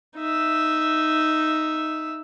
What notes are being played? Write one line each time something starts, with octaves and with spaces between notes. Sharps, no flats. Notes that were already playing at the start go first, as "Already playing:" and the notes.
D#4 E5